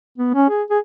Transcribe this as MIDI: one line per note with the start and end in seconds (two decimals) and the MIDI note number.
0.18 0.31 59
0.35 0.47 61
0.50 0.63 68
0.70 0.79 68